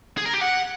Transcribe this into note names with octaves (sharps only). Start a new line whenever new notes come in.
G#4
A#4
G4
F#5